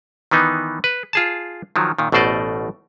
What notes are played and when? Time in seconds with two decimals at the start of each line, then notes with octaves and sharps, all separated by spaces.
0.31 D#3 E3 B3 D#4
0.84 B4
1.13 F4 G#4 A5
1.76 D#3 F3 F#3
1.99 A#2 D#3
2.12 A1 B2 A3 C5 D5 D#5